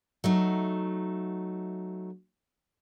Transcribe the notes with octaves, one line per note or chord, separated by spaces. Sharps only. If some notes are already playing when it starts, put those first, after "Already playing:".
F#3 A3 D#4